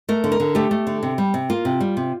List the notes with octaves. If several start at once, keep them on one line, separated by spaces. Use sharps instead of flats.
A3 A#4
D3
A#4
D3
A3 G4
A3
D3
C3
G3
C3
A#3 F4
C3
G3
C3